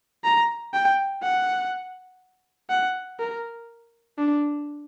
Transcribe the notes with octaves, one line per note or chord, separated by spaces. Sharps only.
A#5
G5
F#5
F#5
A#4
D4